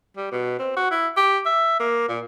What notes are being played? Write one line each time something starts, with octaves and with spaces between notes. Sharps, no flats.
G3
B2
C4
F#4
E4
G4
E5
A#3
A#2